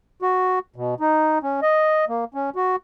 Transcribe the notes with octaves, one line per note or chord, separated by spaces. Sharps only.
F#4
B2
D#4
C#4
D#5
A#3
C#4
F#4